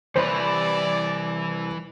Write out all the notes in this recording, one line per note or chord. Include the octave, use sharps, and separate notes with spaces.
C2 E3 B4 C5 D5